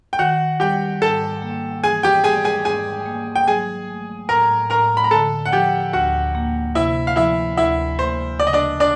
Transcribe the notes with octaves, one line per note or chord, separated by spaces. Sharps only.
G5
D#3 F#4 F#5
G3 G4 G5
G#2 A4 A5
A#3
E3 G#4 G#5
G4 G5
G3 G#4 G#5
G#4 G#5
G#2 G#4 G#5
A#3
G5
F#3 G#4 G#5
A3
A2 A#4 A#5
A2 A#4 A#5
B5
A#5
D3 A4 A5
F#5
F3 G4 G5
D2 F#4 F#5
A#3
C3 E4 E5
F5
F3 E4 E5
D2 E4 E5
A#3 C5
C#3 D5
D#5
D4 D5
D4 D5